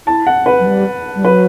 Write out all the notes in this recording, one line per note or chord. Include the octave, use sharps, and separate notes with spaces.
E4 A5
F#5
B4
F#3
G3
G3
F#3 B4